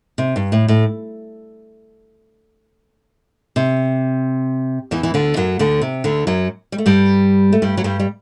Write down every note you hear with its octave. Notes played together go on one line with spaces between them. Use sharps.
C3
G2
A2
A2
C3
E2 E3
E3
D2 D3
F#2 F#3
D2 D3
C3
D2 D3
F#2 F#3
G3
A3
G2 G3
A3
G2 G3
F#3
G2 G3
G3